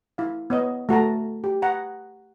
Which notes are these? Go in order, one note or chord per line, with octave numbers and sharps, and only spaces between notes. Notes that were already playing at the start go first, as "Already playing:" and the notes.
E4 F5
B3 C#5 D#5
A3 F#4 A5 A#5
G4
F#5 A#5